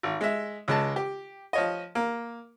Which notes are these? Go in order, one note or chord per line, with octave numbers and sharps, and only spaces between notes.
G#1
G#3 E5
C#2 G#3 A5
G4
F3 C#5 D#5
A#3